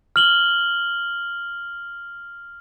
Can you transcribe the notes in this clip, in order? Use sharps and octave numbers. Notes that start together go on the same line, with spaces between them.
F6 F#7 G7